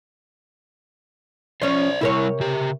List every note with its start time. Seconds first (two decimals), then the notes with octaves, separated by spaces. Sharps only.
1.62 F3 C#4 C5 D5
2.01 C3 G3 E4 A#4 C#5
2.40 C#3 G4